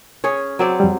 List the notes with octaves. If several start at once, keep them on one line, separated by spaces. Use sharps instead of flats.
C#4 G#4 C#5
F#3 C4 D5
F2 G3